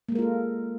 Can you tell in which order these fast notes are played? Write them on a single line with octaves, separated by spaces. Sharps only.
A#3 G#3 A#4 F4 A4